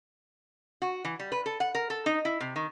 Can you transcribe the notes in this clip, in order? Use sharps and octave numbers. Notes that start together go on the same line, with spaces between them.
F#4
E3
G3
B4
A4
F#5
A#4
A4
D#4
E4
C3
D#3